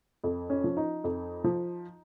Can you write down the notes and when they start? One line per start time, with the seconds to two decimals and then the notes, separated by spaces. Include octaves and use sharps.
0.24 F2
0.50 C#4
0.64 F3
0.77 D#4
1.04 F2
1.44 F3